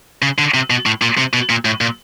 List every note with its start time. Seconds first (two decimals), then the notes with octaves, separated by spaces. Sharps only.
0.22 C#3
0.38 D3
0.54 C3
0.70 B2
0.86 A2
1.02 A#2
1.18 C3
1.33 B2
1.50 A#2
1.65 A2
1.81 A#2